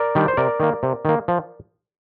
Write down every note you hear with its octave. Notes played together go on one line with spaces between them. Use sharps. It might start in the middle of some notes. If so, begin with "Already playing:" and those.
Already playing: A#4 D5
D#3 G3 D4
C5
C3 A#4 D5
D#3 A#3
C3
D#3 A#3
F3